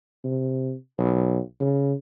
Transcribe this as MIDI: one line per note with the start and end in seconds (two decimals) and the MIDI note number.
0.24 0.73 48
0.98 1.38 35
1.60 1.93 49